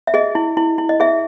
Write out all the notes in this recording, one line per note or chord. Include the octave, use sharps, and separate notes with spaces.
E5
G#4 D#5
E4
E4
E4
D#5
G#4 E5